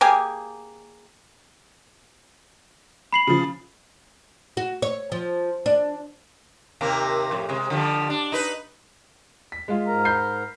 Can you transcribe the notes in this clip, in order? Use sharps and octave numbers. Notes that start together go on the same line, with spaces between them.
A#3 G4 G#4 G#5
B5 C7 F#7
C#3 F3
F#4
C#5
F3
D4
D#2 C3 A#3
F2 A2
C3 G#3
D3 F3 G3
D4
D#4 B4
B6
G#3 F4
G#2 A#4 A#5
B5 G6 C7